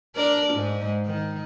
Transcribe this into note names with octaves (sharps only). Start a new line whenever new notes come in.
D4 A#4 D5
G#2 G#3
D#3